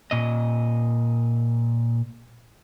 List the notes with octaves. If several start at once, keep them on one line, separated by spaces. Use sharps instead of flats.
A#2 D#5